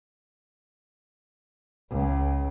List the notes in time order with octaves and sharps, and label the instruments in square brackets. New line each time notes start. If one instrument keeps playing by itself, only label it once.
[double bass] C#2